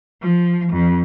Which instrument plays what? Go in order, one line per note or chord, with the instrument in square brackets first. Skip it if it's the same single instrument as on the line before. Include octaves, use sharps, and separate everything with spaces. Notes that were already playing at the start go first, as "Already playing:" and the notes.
[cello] F3
F2